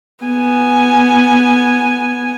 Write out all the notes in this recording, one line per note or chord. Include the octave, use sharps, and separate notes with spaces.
B3 G#5